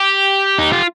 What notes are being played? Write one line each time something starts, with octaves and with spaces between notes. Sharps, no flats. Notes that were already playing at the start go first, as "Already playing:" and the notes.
Already playing: G4
D#4
F4